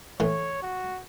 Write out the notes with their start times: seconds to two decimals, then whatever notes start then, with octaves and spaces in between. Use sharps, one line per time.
0.20 A2 E3 C#5
0.63 F#4